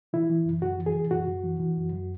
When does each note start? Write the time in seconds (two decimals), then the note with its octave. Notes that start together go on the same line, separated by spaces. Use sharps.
0.13 E3 E4
0.30 E3
0.45 F#2
0.62 F#2 F#4
0.78 E3
0.86 G#4
0.95 E3
1.11 F#2 F#4
1.27 F#2
1.44 E3
1.59 E3
1.77 F#2
1.92 F#2